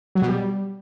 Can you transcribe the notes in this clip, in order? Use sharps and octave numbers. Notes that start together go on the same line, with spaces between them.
F#3
B2
G3